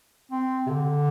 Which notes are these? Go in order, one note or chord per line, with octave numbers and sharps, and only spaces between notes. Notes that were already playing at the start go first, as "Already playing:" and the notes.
C4
C3
D3